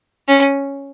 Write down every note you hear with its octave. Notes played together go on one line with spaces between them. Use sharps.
C#4